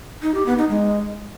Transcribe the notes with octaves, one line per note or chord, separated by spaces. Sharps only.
D#4
G4
B3
D#4
G#3